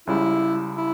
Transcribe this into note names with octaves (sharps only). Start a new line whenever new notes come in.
C#2 C#3 G3 E4
E4